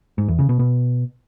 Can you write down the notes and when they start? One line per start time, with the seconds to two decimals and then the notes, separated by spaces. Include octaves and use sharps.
0.18 G#2
0.28 E2
0.39 C#3
0.49 B2
0.59 B2